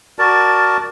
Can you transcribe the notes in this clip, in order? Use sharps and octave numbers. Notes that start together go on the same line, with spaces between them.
F#4 A#4 D5 A5